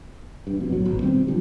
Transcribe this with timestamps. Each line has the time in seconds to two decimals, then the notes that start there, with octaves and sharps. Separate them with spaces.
0.47 E1 G2
0.60 F2 B2
0.72 A#1 A2 F#3
0.86 G#1 B2
1.02 B2 D#3 G3 C4
1.27 D3 F3 G3